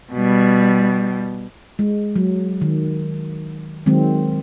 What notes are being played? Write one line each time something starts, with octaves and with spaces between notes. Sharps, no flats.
B2 G3
G#3
F#3
D#3
D#3 F#3 G#3 C4